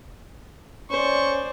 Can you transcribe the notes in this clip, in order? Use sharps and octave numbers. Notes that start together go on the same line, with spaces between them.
C#4 C5 D5 C#6